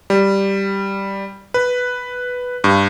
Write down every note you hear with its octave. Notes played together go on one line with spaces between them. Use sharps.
G3
B4
G2